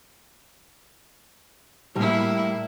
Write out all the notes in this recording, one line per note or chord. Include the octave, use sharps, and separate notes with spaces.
A2 G3 A#3 E4